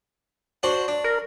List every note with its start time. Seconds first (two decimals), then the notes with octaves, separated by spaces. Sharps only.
0.63 D4 F#4 C5
0.88 D4
1.04 A#4